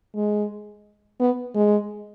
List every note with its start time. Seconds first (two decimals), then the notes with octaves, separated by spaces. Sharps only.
0.15 G#3
1.20 B3
1.55 G#3